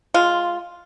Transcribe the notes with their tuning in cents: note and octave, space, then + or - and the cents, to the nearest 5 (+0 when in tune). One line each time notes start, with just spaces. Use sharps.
G#3 +0 F4 +0